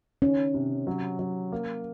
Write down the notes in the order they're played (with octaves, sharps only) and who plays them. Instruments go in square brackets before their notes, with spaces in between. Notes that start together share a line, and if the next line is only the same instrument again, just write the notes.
[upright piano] D#3 [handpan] C#4
[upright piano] C3
F#3
F#3
A#3